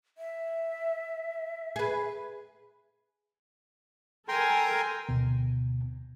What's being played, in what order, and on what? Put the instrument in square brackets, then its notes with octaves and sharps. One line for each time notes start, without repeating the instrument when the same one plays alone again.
[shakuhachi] E5
[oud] G#4 B4
[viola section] A4 A#4 G#5 [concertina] G5 A#5 C6
[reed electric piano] D2 B2